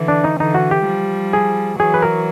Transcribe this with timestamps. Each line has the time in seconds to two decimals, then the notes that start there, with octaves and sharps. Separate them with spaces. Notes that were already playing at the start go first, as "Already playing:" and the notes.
Already playing: D3 E3
0.08 D4
0.24 D#4
0.40 D3 E3 D#4
0.55 F#4
0.71 G4
0.86 F3 G3
1.33 G#4
1.79 E3 F#3 G#4
1.94 B4
2.02 A#4